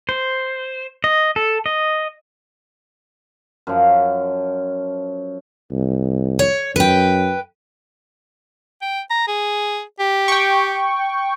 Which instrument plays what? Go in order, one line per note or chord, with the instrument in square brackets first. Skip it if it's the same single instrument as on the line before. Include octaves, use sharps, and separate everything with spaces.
[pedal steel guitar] C5
D#5
A4
D#5
[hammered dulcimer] F#2 F3
[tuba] C2
[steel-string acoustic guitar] C#5
[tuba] F#2 [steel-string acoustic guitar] B4 G5
[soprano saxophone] G5
A#5
G#4
G4
[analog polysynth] G5 C#6